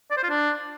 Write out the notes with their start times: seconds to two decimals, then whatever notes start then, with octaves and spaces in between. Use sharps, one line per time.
0.11 D5
0.17 C5
0.23 F4
0.30 D4